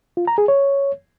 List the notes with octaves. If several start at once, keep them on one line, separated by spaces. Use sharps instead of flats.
F4
A#5
G#4
C#5